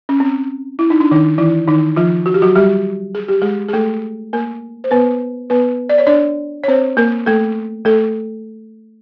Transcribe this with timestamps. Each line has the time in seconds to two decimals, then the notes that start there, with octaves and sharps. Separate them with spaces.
0.09 C#4
0.20 C4
0.79 E4
0.90 D#4
1.00 D4
1.11 D#3 D#4
1.38 E3 E4
1.68 D#3 D#4
1.96 F3 F4
2.26 F#4
2.34 G4
2.42 F#3 F#4
2.55 G3 G4
3.15 G#4
3.29 G4
3.42 G#3 G#4
3.68 G#4
3.73 A3 A4
4.33 A#3 A#4
4.84 C5
4.91 B3 B4
5.50 B3 B4
5.89 D5
5.98 C#5
6.07 D4 D5
6.64 C#5
6.68 C4 C5
6.97 A#3 A#4
7.26 A3 A4
7.85 A3 A4